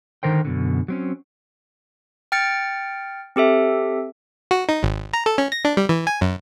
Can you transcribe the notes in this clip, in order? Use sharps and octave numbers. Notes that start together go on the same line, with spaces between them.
D3 D#3 A#4 C5 G5
F#2 B2 D3
F#3 C4 C#4
G5 F6 A6 C#7
C4 G4 A4 E5
F#4
D#4
G#1
A#5
A4
C#4
A#6
D4
G3
E3
G#5
F#2